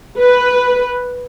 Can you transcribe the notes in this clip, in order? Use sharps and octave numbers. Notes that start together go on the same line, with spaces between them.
B4